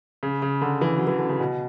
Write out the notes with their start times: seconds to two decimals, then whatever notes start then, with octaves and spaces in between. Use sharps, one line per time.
0.23 C#3
0.42 C#3
0.62 D3
0.81 E3
0.97 F#3
1.07 E3
1.19 D3
1.29 C#3
1.40 B2